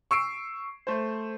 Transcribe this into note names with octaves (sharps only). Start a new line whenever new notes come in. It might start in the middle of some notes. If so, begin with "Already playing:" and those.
C#6 E6 C7 D7
A3 C5